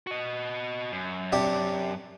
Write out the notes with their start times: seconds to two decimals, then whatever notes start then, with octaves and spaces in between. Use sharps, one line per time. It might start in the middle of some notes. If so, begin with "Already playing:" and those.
0.07 F#4 D#5
0.92 F#2
1.32 C3 D4 G4